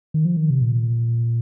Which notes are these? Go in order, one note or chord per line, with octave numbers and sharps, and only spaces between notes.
D#3
F3
D#3
C3
A#2